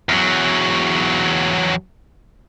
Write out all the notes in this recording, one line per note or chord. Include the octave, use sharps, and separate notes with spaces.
E2 F#3